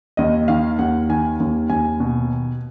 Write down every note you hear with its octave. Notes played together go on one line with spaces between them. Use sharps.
D#2 D#5
D#3 F5
D#2 F#5
D#3 G#5
D#2
D#2 G#5
B2